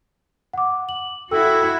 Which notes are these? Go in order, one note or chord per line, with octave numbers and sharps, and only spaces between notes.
F#5 D6
F#7
E4 F#4 A4 G5 E6